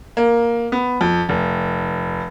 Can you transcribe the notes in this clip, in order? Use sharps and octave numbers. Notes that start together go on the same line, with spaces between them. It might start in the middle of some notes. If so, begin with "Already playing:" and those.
A#3
B3
F2
F1